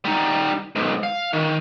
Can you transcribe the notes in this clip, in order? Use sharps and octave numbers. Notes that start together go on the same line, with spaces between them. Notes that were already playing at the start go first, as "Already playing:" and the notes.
G3 D#4
B1 G#2
F5
D#3